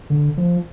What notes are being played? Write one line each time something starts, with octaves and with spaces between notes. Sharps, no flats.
D3
F3